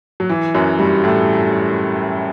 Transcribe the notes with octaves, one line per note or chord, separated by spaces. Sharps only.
F#3
E3
F#2 F#3
G2 G3
A2 A3